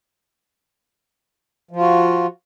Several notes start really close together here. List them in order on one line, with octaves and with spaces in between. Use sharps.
F3 F4 F#4